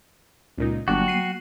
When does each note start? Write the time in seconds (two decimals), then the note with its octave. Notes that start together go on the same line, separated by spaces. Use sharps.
0.58 C#2 A#2 D#4
0.88 G1 F#3 A#3 D4 F#4 G5
1.08 C7 D#7